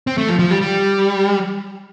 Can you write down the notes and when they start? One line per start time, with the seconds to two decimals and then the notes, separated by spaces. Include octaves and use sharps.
0.07 C4
0.18 A3
0.29 F3
0.39 F3
0.51 G3
0.61 G3